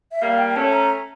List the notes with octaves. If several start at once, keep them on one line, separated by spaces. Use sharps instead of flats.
E5
G3 A#3 F5
G5
A3 C#4 A5
A#5